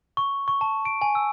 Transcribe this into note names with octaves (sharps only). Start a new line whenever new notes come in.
C#6
C#6
A5
D7
G#5
E6